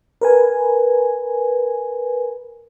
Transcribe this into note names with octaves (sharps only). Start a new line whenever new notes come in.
A#4 B4 G#5